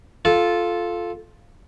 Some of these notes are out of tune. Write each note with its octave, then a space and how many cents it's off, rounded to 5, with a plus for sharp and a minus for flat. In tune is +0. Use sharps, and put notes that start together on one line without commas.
F4 +0 A4 -10